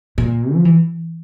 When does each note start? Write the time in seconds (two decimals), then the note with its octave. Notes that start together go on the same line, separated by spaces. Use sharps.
0.18 A#2
0.54 F3
0.65 E3